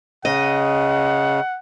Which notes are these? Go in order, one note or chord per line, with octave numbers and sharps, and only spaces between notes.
C#3 D#5 F#5